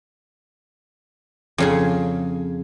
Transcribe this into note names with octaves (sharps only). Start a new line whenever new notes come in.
F2 C#3 G#4